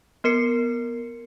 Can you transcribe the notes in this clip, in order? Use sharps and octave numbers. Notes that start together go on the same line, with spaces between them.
B3 A#4 C7 C#7